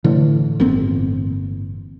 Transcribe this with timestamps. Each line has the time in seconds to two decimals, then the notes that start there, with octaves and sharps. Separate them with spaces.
0.04 A2 D3 E3
0.60 G1 A#3 C4